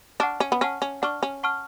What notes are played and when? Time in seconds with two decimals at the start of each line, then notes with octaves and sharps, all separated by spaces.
0.20 D4 F#5 A5 C#6 F6
0.40 C#4
0.52 B3
0.61 C#4 F#5 A5 C#6 F6
0.82 C#4
1.02 D4 F#5 A5 C#6 F6
1.23 C#4
1.43 F#5 A5 C#6 F6